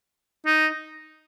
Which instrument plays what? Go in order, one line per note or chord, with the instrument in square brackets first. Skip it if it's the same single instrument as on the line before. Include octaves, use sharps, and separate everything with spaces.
[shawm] D#4